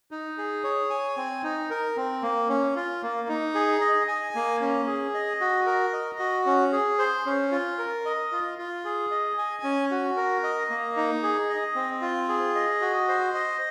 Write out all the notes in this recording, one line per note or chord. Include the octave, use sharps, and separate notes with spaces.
D#4
G#4
C#5
G#5
C4
D#4
A#4
C4
A#3
C#4
F4
A#3
D#4
G#4
D#5
G#5
A#3
C#4
G#4
D#5
F#4
A#4
D#5
F#4
C#4
G#4
C5
C#4
F4
A#4
D#5
F4
F4
G#4
D#5
G#5
C#4
F#4
A#4
D#5
A#3
D#4
G#4
D#5
C4
F4
G#4
D#5
F#4
C5
D#5